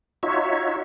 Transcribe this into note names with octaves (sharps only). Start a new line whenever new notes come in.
D#4 F4 F#4 C#5 E5